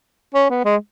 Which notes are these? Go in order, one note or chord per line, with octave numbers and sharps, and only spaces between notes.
C#4
B3
G#3